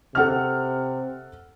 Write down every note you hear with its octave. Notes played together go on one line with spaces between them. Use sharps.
C3 A4 F#5 F6